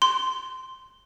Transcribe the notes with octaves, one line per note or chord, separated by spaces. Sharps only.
C6